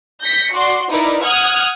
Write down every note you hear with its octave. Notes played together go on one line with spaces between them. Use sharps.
G6 A#6 B6 C#7
F#4 D5 C6
D#4 E4 A#4 B4 D5
F#5 D#6 F6 F#6 G#6